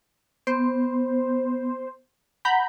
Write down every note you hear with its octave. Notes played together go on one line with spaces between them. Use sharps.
B3 C5
F#5 A#5 B5 G6